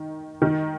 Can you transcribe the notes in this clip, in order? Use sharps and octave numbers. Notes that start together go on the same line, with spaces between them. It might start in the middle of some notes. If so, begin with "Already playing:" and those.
Already playing: D#3
D#3